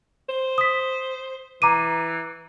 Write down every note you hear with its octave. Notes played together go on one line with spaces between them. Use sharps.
C5
D#6 B6
E3 A#5 D6 D#7